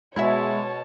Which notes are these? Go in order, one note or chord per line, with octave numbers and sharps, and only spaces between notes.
B2 G#3 E4 F#4 C#5 E5 A5